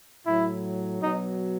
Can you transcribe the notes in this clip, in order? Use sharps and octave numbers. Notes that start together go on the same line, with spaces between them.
A2 F#3 E4
B2 F#3 D#4